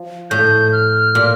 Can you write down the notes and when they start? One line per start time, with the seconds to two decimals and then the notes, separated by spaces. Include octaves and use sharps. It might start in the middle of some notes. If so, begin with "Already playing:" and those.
Already playing: F3
0.30 A2 G6
0.73 F6
1.15 A#2